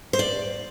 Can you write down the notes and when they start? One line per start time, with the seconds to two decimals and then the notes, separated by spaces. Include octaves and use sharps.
0.13 C5
0.19 D5